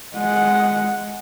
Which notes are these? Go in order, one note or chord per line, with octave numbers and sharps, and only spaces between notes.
G#3 F#5